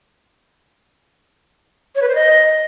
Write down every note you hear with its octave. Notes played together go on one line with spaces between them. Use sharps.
C#5
B4
C5
D#5